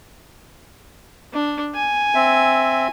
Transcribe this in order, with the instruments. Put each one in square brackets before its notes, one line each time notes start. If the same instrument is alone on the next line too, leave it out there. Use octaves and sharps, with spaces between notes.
[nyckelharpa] D4
G#5
[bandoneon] C4 E5